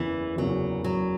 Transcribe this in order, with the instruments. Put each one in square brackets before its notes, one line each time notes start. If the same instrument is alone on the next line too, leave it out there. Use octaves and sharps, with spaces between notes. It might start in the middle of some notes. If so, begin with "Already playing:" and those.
Already playing: [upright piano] F#1 E2 C#3 [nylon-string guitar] E3
[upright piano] F#1 E2 C#3 [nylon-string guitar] F#3
[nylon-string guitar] F#3